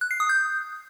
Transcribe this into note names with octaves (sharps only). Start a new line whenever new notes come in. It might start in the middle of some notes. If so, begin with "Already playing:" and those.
F#6
C7
D#6
G6